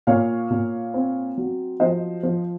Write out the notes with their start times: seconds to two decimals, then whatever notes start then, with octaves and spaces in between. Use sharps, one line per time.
0.07 A#2 C#5 F5
0.50 A#2
0.94 C4
1.38 F#3
1.80 F3 C5 D#5
2.23 F3